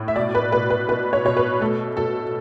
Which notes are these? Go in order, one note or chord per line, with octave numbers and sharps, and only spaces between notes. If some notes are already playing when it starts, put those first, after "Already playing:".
Already playing: A2
E5
B2 D5
B4
B2 B4
B4
B2 B4
C#5
B2 C#5
B4
A3 A4
B2 A4